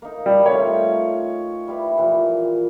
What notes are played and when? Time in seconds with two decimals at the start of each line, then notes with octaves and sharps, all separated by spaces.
0.02 A#3 D#4
0.26 G3
0.46 A3 C4 F4 C#5
1.68 G3 E4 B4
1.98 A#2 E3 F3